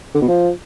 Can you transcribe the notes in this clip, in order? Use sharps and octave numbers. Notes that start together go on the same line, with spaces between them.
D3
B2
F3